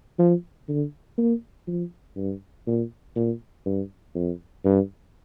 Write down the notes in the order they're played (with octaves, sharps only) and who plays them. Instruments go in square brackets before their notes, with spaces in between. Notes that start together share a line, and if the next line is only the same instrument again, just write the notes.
[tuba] F3
D3
A#3
F3
G2
A#2
A#2
G2
F2
G2